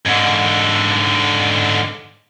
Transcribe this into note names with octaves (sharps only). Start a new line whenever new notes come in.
G#2 D3